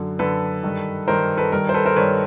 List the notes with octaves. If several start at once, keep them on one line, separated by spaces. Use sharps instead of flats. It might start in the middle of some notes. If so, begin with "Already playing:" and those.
Already playing: F#2 D3
F#2 D3 A4 B4
G2 D#3
G2 D#3 A#4 C5
A4 B4
G2 D#3 A#4
C5
A4 B4
A#4 C5
G2 D#3 B4 C#5